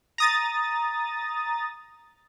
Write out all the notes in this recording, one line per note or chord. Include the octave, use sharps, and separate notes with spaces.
A#5 D#6 A6